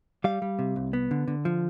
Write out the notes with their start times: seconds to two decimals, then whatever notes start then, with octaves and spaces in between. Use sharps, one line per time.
0.24 G3 F5
0.42 G3
0.59 C3
0.76 C2
0.93 B3
1.11 D3
1.28 D3
1.45 F3